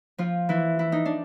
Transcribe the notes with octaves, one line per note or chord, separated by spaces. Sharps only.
F3 F4
E3 E4
E4
D#4
D4